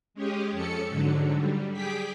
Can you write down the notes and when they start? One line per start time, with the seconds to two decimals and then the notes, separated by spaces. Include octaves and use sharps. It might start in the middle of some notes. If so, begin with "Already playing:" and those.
0.14 G#3 C#4 G4 G#4
0.52 F2 C#4 A4 C#7
0.89 G#2 D3 F#3
1.36 G3
1.73 G4 G#4 G5 B6